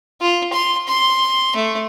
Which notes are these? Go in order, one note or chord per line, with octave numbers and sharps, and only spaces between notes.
F4
C6
C6
A3